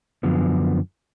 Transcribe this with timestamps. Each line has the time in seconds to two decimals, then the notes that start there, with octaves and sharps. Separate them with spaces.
0.23 F#2 D3 F3 B3